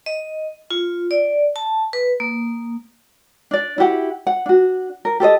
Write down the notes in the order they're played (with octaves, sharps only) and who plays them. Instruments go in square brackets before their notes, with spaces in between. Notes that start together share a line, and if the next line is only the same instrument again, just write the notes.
[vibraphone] D#5
F4
D5
A5
B4
A#3
[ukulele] D4 D5
E4 F#4 G4 F#5
F#5
D4 F#4
A#4
G4 A4 C5 D#5